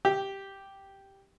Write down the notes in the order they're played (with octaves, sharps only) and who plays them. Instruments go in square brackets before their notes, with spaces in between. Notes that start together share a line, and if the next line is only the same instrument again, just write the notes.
[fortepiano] G4